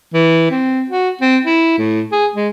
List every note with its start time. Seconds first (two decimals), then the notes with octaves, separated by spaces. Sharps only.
0.14 E3
0.51 C4
0.89 F#4
1.21 C4
1.45 E4
1.78 A2
2.12 G#4
2.35 G#3